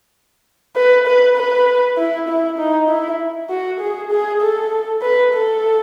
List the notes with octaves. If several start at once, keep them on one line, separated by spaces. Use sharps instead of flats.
B4
B4
B4
E4
E4
D#4
E4
F#4
G#4
G#4
A4
B4
A4